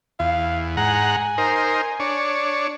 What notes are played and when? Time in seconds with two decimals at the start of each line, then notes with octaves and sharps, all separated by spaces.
0.20 E2 F5
0.77 G#2 F#5 G#5 A#5
1.38 D#4 A#4 C5
2.00 D4 C#5